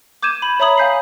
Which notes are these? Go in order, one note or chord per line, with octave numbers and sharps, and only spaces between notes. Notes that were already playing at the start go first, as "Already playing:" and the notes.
D6 G6 G#6 D#7 E7
B5
C#5 E5 A#5 B5 D#6 F#7
F5 G#5 G6 B6 C7